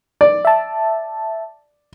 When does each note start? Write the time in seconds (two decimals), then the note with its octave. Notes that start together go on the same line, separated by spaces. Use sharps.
0.21 D5
0.45 E5 A5